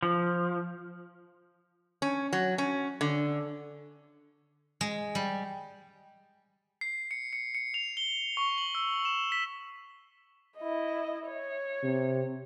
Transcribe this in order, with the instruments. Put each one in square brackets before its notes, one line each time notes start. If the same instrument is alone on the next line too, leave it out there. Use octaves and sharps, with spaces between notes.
[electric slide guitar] F3
[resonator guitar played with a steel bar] C#4
F#3
C#4
D3
[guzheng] G#3
G3
[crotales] C7
C#7
C#7
C#7
F7
G7
C#6
F#7
E6
E7
B6
[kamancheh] E4 D#5
C#5
[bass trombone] C3